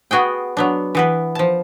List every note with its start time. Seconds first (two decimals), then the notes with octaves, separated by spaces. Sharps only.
0.11 B3 F#4 G#4 G5
0.57 F#3 B3 D4
0.95 E3 B3 B4
1.35 F3 A5